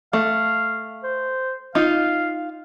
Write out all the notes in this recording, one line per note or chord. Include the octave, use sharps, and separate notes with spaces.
A3 F5
C5
D#4 F4 F5